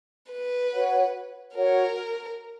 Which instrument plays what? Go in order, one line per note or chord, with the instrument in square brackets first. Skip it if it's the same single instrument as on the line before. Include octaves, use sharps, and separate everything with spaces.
[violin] B4
[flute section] F#4 C#5 F#5
[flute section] F#4 C#5 F#5 [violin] A#4